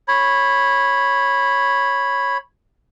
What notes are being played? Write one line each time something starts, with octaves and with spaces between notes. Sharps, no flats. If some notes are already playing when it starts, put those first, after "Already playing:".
C#5 B5